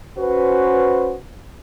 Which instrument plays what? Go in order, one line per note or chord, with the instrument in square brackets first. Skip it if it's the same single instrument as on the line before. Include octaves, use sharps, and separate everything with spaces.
[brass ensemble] C#4 F#4 B4 C5